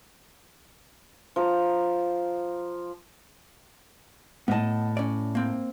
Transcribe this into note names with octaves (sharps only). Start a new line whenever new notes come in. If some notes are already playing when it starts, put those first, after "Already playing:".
F3 A#5
A2 B3 D#5 A5
C#4 D5
A#3 C4